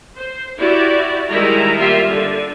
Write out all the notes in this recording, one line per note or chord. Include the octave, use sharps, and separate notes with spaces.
C5
E4 F#4 G4 D5
D#3 G3 G#3 E4 A#4 A#5
G3 A#3 F4 G4 E5
D3